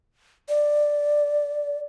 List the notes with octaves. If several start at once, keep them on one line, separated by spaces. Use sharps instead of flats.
D5